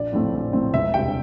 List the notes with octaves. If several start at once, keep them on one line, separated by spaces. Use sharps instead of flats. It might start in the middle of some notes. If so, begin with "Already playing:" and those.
Already playing: A#1 D5
A2 F3 A3 C4
A#1
A2 F3 A3 C4
E1 E5
D2 C3 G3 G5